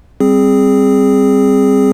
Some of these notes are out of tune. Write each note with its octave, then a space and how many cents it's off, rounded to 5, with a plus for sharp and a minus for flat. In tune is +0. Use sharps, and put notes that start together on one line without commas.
G3 +0 C4 +0 G#4 -5